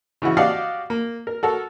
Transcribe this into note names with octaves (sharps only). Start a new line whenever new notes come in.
C#3 E3 E4 F#4
F#4 G4 D5 D#5 F5 F#5
A#3
A#4
F#4 A4 A#4